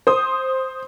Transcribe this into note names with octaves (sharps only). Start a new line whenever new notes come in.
C5 D#6